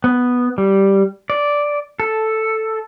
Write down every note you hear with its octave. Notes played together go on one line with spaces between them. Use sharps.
B3
G3
D5
A4